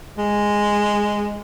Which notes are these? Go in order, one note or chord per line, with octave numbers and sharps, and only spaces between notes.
G#3